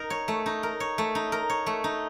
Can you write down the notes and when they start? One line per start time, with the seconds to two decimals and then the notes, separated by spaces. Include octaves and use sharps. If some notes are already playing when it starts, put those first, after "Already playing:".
Already playing: D#4 A#4
0.10 C#5
0.28 A3
0.46 D#4
0.63 A#4
0.80 C#5
0.98 A3
1.15 D#4
1.32 A#4
1.50 C#5
1.66 A3
1.84 D#4